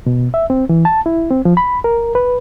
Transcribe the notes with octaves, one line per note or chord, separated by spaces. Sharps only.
B2
E5
C4
E3
A5
E4
C4
F3
B5
A#4
B4